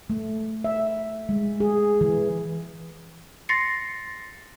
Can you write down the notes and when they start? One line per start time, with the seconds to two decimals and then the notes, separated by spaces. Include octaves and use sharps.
0.10 A3
0.64 E5
1.29 G#3
1.60 G#4
2.01 E3
3.49 C6 A6 A#6 C7 C#7